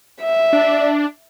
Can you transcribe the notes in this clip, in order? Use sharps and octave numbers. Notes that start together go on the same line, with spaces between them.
E5
D4